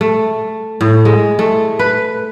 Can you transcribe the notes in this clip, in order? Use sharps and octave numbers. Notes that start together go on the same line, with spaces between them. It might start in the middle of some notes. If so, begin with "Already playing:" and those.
A3
A2
G#3
A3
B4